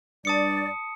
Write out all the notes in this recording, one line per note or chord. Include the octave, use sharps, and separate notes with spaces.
G2 D5 A5 D#6 C#7